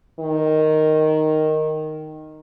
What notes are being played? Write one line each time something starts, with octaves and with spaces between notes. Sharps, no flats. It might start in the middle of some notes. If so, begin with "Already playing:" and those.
D#3